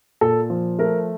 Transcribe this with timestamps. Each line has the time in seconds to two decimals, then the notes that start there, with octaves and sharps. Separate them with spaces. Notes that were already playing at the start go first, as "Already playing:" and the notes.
0.21 A#2 A4
0.50 F3
0.79 A3 A#4